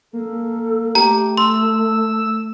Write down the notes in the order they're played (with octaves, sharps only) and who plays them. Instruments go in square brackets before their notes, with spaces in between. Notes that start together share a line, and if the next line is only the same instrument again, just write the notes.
[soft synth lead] A#3 [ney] A4
[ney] A3 [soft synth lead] G4 [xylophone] A#5
[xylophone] C6 [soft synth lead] E6